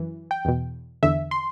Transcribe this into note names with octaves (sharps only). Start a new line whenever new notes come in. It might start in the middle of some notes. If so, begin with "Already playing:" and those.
Already playing: F#2 E3
G5
E2 B2
E2 D3 E5
C6